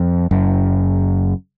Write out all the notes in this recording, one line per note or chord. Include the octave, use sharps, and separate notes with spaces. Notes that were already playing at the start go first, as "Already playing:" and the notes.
Already playing: F2
F#1 F#2